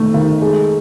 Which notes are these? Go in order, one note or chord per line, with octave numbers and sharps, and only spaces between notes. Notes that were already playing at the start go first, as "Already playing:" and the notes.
Already playing: D#3 A3
D#3
G#3